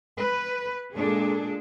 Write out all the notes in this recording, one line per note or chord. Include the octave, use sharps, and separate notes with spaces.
B4
A#2 G#3 D4 G#4 A4